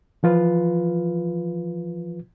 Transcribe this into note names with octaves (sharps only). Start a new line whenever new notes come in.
E3 F3 F4 B4